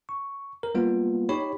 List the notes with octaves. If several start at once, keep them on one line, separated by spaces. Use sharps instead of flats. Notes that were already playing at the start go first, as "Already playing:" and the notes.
C#6
A#4
G3 A#3 B3 F4
D#4 G4 C#5 B5